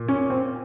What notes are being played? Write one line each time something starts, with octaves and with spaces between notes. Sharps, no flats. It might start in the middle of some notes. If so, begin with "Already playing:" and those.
Already playing: A#2
C#4
C4